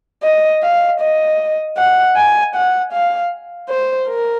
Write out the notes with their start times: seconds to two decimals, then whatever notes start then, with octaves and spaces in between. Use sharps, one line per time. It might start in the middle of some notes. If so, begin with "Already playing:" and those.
0.23 D#5
0.63 F5
1.01 D#5
1.77 F#5
2.16 G#5
2.55 F#5
2.93 F5
3.69 C5
4.08 A#4